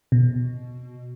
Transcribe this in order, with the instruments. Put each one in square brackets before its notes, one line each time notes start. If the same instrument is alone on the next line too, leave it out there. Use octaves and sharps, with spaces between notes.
[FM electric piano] B2